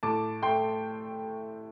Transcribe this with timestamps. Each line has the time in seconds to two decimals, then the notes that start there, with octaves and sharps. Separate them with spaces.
0.03 A2 A5 D6
0.42 A3 G5 C6